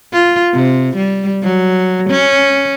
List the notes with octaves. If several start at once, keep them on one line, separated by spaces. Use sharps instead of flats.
F4
C3
G3
F#3
C#4